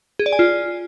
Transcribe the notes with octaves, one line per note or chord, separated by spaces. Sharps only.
G#4
D5
G#5
F4